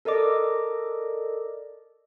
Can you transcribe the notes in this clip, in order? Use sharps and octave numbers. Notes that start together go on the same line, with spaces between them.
A4 A#4 D5 D#5 D6